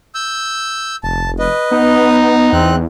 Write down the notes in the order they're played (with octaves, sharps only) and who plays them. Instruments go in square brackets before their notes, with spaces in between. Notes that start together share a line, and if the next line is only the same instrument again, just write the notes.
[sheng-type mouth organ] E6 G6
[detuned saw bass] F1 [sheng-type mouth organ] A5
[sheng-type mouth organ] B4 D#5
[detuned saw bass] B3 [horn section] D#4
[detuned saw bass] E2 [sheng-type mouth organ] C4 F#6